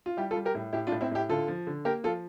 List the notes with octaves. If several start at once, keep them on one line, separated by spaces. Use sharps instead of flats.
F4
G3 E4 G4
F4 A4
G3
G4 A#4
A2
A2 E4 G4
D4 F4
A2
C4 E4
A2 E4 G4
D3 F4 A4
F3
D3
A#3 G4 A#4
F3 F4 A4